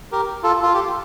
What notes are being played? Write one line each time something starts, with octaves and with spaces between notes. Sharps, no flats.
G4 A#4
F4 A4
F4
G4